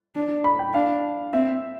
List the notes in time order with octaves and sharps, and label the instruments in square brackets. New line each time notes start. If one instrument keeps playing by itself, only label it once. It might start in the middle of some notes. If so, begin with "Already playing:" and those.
[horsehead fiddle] D4
[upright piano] B5
G5
[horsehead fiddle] D4 [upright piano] F5
[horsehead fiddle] C4 [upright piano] E5